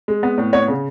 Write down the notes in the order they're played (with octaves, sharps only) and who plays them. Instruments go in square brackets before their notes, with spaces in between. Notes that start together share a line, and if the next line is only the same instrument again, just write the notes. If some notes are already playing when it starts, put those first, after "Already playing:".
[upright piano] G#3
B3
A2
B3 C#5
C#3